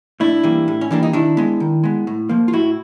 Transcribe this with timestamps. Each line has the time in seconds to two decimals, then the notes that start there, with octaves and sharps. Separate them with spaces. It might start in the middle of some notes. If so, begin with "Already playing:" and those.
0.20 A2 D4 E4
0.43 E3 G3 A#3
0.68 A2
0.81 C#4
0.91 E3 G3 A#3 D4
1.03 D#4
1.13 D#3 D4 E4
1.37 G#3 B3
1.60 D#3
1.84 G#3 B3
2.07 A2
2.29 F3 A#3
2.48 F4
2.53 A2 E4 F#4